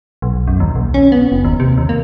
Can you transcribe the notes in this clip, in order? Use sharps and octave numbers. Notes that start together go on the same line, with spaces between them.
B1
F#2
D#2
B1
C#4
B3
F#1
D#2
C3
D#2
A#3